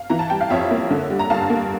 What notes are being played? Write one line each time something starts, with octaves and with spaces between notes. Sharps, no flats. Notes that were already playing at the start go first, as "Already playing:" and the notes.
Already playing: F5
E3 A#5
A5
G3 G5
F5
F2 C#5 E5
A#3
D3
G3
A#5
G2 F5 A5
A#3